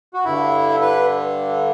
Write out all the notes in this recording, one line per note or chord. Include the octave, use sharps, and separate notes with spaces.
F#4
G2 D3 E4
B4